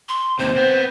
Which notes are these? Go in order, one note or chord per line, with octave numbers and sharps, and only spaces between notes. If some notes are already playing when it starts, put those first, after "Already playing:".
C6
D#2 C3 C5
B3 C4